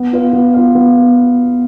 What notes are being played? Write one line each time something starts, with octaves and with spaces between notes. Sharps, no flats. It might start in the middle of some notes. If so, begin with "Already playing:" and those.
Already playing: B3
F4 B4 F5
B3
F4 B4 F5
B3